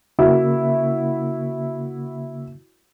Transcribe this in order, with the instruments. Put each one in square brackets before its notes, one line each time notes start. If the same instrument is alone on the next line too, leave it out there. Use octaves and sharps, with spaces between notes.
[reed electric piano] C#3 A#3 [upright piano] E4 F#4